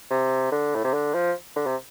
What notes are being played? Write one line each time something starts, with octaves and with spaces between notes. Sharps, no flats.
C3
D3
A2
C3
D3
F3
D3
C3